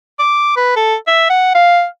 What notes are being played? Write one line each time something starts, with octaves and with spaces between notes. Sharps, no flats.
D6
B4
A4
E5
F#5
F5